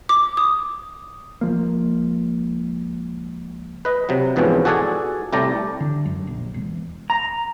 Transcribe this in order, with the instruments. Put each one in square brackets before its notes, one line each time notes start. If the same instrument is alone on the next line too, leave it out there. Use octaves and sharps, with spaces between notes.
[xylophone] D6
D#6
[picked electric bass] C#2 F3 A#3
[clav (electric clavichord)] B4 D#5
C3 F#3
E2 G#2 B2 F3 C4 C#4
F#4 G#4 A4 D5 F#5 G#5
C2 A2 A3 G4 D5 A#5
[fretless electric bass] D3
F#2
A#1
E1
[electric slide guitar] A#5